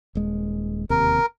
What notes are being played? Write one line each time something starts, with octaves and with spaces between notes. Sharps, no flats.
D#1 G#3
E1 D#2 C3 A#4